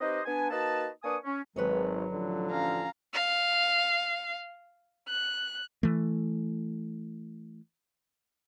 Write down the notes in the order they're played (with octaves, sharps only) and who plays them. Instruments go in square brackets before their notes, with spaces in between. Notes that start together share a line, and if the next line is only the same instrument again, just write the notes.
[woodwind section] C4 D#4 G4 B4 C5 D#5
B3 D4 G#5
A#3 D#4 F#4 B4 D#5 A5
A#3 D4 B4 G#5 C#6 D#6
C#4
[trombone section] G#1 [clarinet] F#3 [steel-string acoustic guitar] B4 C#5 D#5
[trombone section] A1 D3 F3
[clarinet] C#4 [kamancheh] F5 A#5
[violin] F5
F#6
[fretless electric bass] E3 A3